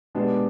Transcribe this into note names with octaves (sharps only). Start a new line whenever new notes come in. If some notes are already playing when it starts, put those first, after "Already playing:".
B2 G#3 B3 D4 G4